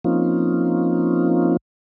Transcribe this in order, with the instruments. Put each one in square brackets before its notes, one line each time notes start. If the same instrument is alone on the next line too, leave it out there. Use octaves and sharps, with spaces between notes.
[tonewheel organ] F3 A#3 C4 C#4 D#4 F4